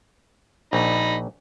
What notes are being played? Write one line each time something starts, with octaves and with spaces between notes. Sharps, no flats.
A#1 D#4 D#5 B5